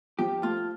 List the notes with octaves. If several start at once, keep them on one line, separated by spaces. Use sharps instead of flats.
F3 G4
A3 F4